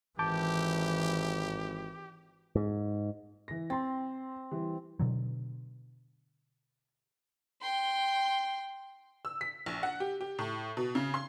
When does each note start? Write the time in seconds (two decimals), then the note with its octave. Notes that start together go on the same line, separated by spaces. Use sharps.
0.19 G#1 E3 G4 A5 D6 G6
2.56 G#2
3.48 E3 A#6
3.70 C4 C6 A6
4.51 E3 G3
4.99 B2 D3 F#3
7.61 G5 C6
9.25 E6
9.41 B6
9.66 A#1
9.83 F#5
10.00 G4
10.21 G4
10.39 A2
10.77 B2
10.95 C#3
11.14 C6